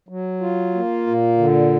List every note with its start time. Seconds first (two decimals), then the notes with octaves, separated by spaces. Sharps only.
0.09 F#3
0.41 F4
0.74 A#3
1.07 A#2
1.38 D3